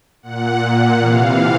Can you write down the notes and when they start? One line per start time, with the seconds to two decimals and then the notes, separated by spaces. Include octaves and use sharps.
0.23 A#2 F#5
0.61 F#5
0.99 C3 E3 F5